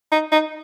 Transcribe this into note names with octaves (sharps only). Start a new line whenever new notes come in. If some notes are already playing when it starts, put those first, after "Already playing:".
D#4
D#4